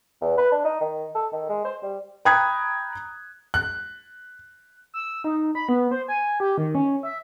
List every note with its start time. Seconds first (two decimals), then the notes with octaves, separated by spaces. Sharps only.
0.21 E2
0.38 B4
0.52 D4
0.65 D#4
0.81 D#3
1.15 A4
1.33 D#3
1.49 G#3
1.65 C5
1.83 G3
2.25 G5 A#5 B5 D#6 F#6 G#6
3.54 F#6
4.94 E6
5.24 D#4
5.55 B5
5.69 B3
5.91 C5
6.08 G#5
6.40 G4
6.58 D#3
6.75 C#4
7.03 E5